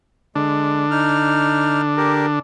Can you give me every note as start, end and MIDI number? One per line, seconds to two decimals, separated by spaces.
0.35 2.39 50
0.35 0.85 56
0.35 2.39 62
0.91 1.81 63
0.91 1.81 89
1.97 2.26 67
1.97 2.26 70